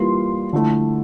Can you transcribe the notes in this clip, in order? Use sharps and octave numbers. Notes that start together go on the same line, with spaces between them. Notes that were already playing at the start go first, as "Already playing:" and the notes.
Already playing: E3 G3 A#3 F4 C6
D3 F3 A3 E4